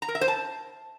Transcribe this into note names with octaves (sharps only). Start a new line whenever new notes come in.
A#5
A#4
E5
C5
A5